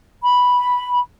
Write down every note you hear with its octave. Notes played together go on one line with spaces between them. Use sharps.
B5